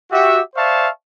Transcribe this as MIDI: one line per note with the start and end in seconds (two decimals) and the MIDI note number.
0.11 0.40 66
0.11 0.40 67
0.11 0.40 76
0.55 0.88 72
0.55 0.88 74
0.55 0.88 76
0.55 0.88 77
0.55 0.88 81
0.55 0.88 85